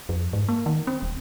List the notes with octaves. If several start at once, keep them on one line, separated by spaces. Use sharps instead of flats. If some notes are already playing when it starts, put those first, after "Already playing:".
F2
G#2
A#3
D#3
C4
D#1